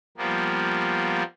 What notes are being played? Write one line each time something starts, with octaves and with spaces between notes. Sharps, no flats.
F3 G3 A#3 B3